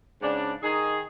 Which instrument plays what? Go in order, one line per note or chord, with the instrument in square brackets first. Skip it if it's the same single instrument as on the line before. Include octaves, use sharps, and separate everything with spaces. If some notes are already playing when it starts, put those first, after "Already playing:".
[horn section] G#2 C#3 D4
D#3 D#4 G#4